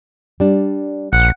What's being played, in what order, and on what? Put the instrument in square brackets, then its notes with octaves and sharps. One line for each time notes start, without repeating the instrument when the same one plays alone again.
[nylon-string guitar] G3 D4
[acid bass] A#1 [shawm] F#5